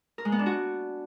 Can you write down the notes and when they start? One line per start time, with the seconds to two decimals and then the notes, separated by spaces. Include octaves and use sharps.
0.18 A#4
0.25 G#3
0.32 B3
0.39 D4
0.46 F#4